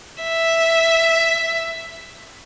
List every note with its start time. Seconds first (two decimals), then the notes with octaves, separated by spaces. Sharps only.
0.21 E5